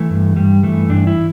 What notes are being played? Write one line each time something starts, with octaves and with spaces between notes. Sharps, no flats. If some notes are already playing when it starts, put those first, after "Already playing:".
Already playing: E3 A3
G2
G2 G3
E3 A3
G2 D4
E4